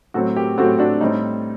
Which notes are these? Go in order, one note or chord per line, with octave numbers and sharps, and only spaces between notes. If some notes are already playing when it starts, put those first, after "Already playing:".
A2 F#3 A3 C4 F#4 A4
G4 A#4
A2 F#3 A3 C4 F#4 A4
D4 F#4
A2 G3 C4 D#4